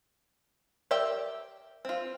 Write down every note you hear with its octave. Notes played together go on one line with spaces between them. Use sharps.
G4 A#4 D5 E5 G5
C4 F4